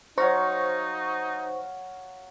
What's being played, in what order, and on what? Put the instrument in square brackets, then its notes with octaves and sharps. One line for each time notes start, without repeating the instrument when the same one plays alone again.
[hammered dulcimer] F#3 F5 A#5 [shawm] D#4 [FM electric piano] C5 C#6